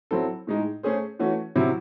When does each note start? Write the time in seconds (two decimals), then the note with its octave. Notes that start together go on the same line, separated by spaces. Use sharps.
0.11 F#3 C4 E4 A4
0.47 A2 G#3 D#4
0.83 A3 C#4 G#4 C5
1.19 E3 A3 C#4 F#4
1.56 C3 F#3 C#4 E4